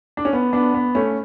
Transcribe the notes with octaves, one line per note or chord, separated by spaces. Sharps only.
D4
C#4
B3
B3 D4
B3
A3 C#4